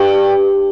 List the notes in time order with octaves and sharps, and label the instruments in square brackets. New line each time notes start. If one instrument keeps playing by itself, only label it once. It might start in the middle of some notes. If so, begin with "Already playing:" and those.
Already playing: [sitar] G2